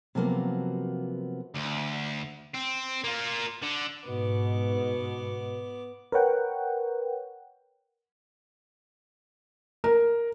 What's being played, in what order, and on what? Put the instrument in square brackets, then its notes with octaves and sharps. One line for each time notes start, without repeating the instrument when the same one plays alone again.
[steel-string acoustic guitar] C3 F3 F#3 A#3 B3 F#4
[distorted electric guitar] D2
C4
A#3 F4
D3
[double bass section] G#2 [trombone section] B2 [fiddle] B3 D6
[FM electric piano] A#4 B4 C#5 F#5 G5
[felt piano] A#4